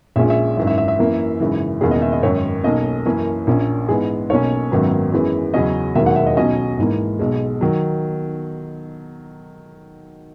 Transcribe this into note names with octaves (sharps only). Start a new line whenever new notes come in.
A#1 A#2 G#3 C#4 E5
E5
G#1 F#2 E3 E5
E5
E5
E5
F#2 E3 A#3
G#1 F#2 C#3 E3
E1 E2 D#3 A#3 C#4 G#4
D#5
E5
D#5
G#1 F#2 D#3 C#5
B1 B2 A#3 C#4 D#5
F#2 E3 A#3 C#4
A#1 A#2 A#3 C#4
G#2 E3 B3 G#4
B1 B2 A#3 C#4 C#5
G#1 F#2 D#3 F#3 B3
F#2 E3 G#3 B3
E2 C#3 F#3 C#4 D#5
E1 D#2 D#3 F#3 A#3 E5
F#5
E5
D#5
B1 B2 F#3 C#4 D#5
G#1 G#2 E3 A#3
B1 B2 G#3
D#3 F#3